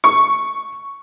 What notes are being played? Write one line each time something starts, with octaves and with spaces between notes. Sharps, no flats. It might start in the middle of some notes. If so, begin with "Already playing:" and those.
C#6